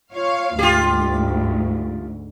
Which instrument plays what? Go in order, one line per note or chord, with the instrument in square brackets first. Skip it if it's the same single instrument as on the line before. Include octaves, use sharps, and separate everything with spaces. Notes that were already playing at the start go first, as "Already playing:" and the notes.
[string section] F4 C#5 F5
[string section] D2 G#2 [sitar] F4 G4